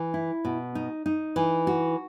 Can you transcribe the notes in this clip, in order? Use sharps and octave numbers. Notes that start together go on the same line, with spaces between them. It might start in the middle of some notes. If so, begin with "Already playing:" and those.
Already playing: E3
E4
B2
D#4
D#4
E3
F#4